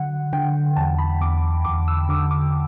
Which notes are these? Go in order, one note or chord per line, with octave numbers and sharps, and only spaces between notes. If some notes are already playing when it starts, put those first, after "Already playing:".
Already playing: D3 F#3 F#5
D3 G5
E2 A5
B5
E2 D6
E2 D6
E6
D3 D6
D6